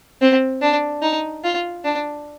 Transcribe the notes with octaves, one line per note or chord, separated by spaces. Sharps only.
C4
D4
D#4
F4
D4